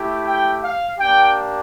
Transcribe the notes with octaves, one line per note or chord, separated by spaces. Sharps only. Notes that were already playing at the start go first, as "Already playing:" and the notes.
Already playing: A3 E4 G4
G5
F5
A#3 D4 G4 G5